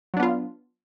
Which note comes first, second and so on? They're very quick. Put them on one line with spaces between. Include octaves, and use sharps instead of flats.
F#3 D4 B3 F4